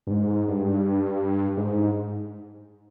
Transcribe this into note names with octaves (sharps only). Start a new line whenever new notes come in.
G2
G#2
G2
G#2